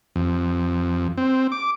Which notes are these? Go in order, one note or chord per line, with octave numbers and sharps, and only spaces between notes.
F2
C4
D6